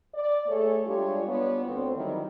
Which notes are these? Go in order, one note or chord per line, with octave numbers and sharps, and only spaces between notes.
D5
A3 G#4 A4 C#5
G3 G#3 D4 F4 G4 C#5
G3 B3 D4 F4 C#5
D2 C4
D#3 F#3 G3 E4